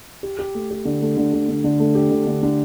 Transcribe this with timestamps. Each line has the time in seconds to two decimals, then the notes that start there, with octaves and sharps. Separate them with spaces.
0.23 G4
0.39 G4
0.55 A3
0.71 G4
0.85 D3
1.02 A3
1.17 D3
1.33 D3
1.49 D3
1.64 D3
1.80 A3
1.95 G4
2.11 D3
2.27 D3
2.43 D3